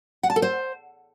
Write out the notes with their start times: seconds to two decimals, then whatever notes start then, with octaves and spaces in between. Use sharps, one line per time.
0.23 F#5
0.30 A5
0.36 A4
0.42 C5